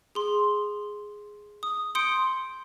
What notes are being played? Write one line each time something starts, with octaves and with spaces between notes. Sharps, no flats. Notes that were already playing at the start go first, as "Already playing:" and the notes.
G#4 C6
D#6
C6 D#6 G6 C#7 D7